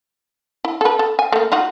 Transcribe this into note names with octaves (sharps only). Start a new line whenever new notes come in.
E4
A4 B4
A4
G#5
A3 A#3
D#4 F4 F#4